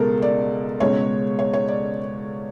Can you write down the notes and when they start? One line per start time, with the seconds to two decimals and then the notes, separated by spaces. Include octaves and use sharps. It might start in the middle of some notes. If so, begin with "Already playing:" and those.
Already playing: C#2 B2 G#3 A4 A#4
0.22 D5
0.80 C#2 B2 G#3 C#5
1.39 C#5
1.53 C#5
1.68 D5